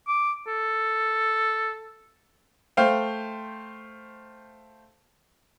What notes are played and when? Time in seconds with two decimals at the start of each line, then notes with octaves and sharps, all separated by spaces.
0.08 D6
0.47 A4
2.77 A3 C5 F5 G5